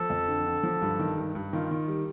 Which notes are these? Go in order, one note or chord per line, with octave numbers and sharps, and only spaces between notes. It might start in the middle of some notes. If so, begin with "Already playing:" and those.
Already playing: F3 A4
F2
D3
D3
F3
G2
D#3
G2
G2
D#3 F4
D#3
G3